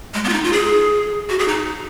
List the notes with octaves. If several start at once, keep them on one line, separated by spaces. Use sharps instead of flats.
G#3
B3
F4
D#4
F4
G#4
F#4
G#4
D#4